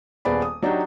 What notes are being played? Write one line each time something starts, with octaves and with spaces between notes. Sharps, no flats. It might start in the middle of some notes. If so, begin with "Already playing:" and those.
D#1 B3 G#4 D5 B5
D#6
F#3 D4 D#4 F#4 G4